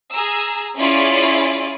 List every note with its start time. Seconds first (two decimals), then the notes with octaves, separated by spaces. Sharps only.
0.11 G#4 A#5 E6
0.78 C#4 E4 F4 G#4 C#5 D5